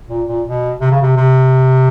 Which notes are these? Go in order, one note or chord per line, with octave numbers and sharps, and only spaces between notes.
A#2
A#2
B2
C3
C#3
C3
C3